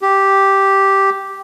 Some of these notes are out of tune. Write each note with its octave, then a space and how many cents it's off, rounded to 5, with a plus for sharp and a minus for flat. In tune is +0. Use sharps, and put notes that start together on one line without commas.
G4 -5